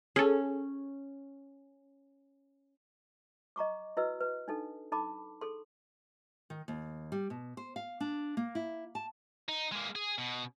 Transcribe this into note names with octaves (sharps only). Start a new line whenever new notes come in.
C#4 G#4 A4
D#5 A#5 C#6 D6
E4 F#4 B4 D#5 E6
B4
D4 D#4 A4
D#4 A4 A5 B5 D6
G#4 A4 C6
D#3
D#2
G3
B2
C5
F5
D4
A#3
E4
A5
D#4
G#3 A#3
G#4
B2